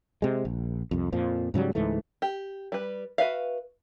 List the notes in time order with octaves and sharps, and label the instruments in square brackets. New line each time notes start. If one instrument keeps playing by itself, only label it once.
[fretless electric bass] C3 G#3
A#1
C2 F2
F2 A#2 F3
G#2 C#3 F#3 G3
C#2 G#2 E3 A3
[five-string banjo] G4
G3 B4
F#4 B4 E5 F5